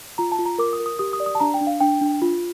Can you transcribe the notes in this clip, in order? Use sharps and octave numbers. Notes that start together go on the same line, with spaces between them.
F4 A#5
A5
F4
A#5
A#4 D6
D#6
A#4
D#6
G4 D#6
D#6
D5
D#6
A5
D4 A#5
G5
D4
F5
D4 G5
D4
F4